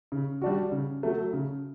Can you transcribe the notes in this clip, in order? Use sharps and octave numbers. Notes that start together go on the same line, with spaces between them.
C#3
G3 D4 F#4
C#3
F#3 A3
C#3